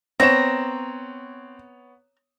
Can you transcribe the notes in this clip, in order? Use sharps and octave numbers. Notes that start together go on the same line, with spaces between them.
B3 C4 C#5 A#5 E7